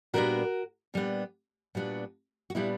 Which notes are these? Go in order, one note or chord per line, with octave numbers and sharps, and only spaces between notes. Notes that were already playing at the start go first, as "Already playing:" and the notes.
A#2 G3 B3 D4 F#4 A#4
A#2 G3 B3 D4
A#2 G3 B3 D4 F#4
F#4
A#2 G3 B3 D4 E4